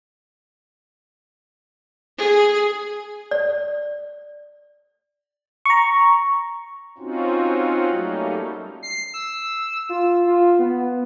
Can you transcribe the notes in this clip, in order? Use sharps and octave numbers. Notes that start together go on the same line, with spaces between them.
G#4
D5
A#5 C#6
C4 C#4 D#4 F4 F#4
F#3 G3 A3 A#3 C#4 D#4
C7
E6
F4
F4
B3